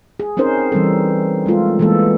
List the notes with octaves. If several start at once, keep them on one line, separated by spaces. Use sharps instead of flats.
G#4
C4 C#4 D#4 A#4 C5
E3 G3 C4 A4
G#3 A3 F4 A4
E3 G#3 A#3 B3 A4